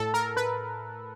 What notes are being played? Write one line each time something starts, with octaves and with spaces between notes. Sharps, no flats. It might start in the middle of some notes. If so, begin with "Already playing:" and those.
Already playing: A2 A4
A#4
B4